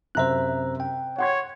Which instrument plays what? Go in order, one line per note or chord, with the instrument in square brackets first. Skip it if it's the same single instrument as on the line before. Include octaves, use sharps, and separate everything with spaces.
[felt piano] F#2 C3 E5 [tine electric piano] C5 A#5 F#6
[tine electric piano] G5
[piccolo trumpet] C#5 [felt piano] F#5 C6 G#6